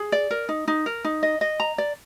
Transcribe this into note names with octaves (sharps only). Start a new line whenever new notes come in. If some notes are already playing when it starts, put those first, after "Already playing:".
Already playing: G#4
D5
A#4
D#4
D#4
A#4
D#4
D#5
D#5
A#5
D5